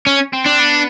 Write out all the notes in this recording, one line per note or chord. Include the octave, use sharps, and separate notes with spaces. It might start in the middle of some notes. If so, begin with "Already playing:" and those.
C#4
C4
D4
B3